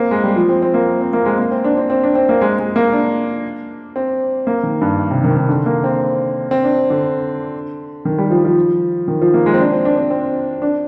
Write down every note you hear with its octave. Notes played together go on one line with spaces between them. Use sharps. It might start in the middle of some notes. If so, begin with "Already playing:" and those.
Already playing: A#3 C4
G#3
G3
F3
C4
C4
A#3
C4
A#3
G#3
A#3
C4
D4
C4
C4
D4
C4
A#3
G#3
G#3
A#3
D4
C4
A#3
D#3
G2
C3
D#3
D#3
D3
A#3
C4
C4
D4
D3
D#3
G3
F3
F3
D#3
F3
A#3
G#3
C4
D4
C4
D4
C4
C4
D4